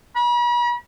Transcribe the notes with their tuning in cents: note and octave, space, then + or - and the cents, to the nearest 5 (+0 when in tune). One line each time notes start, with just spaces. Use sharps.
B5 -45